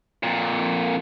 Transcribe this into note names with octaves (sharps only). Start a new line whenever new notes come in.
F2 A#2